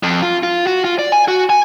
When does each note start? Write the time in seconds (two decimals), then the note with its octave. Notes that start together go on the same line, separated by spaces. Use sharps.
0.03 F2
0.22 F4
0.43 F4
0.67 F#4
0.84 F4
0.99 D5
1.12 G#5
1.28 F#4
1.50 G#5